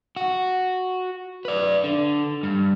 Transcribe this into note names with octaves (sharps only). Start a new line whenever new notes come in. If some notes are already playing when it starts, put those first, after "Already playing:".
F#4
B4 D5
D3
G2